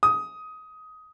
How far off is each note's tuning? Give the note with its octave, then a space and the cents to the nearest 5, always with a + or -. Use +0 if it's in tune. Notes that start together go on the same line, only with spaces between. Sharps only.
D#6 +15